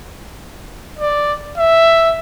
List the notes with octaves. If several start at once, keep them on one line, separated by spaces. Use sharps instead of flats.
D5
E5